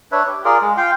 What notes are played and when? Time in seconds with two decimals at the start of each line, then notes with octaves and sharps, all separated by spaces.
0.12 D4 B4 C#5 E5
0.27 G4
0.45 F4 G#4 A#4 D5
0.62 G#3
0.77 F4 F5 G5